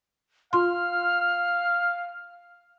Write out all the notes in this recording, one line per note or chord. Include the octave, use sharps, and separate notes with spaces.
F4 F5 C6 F6